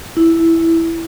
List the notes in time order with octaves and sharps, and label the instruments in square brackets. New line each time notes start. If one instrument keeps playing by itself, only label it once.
[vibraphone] E4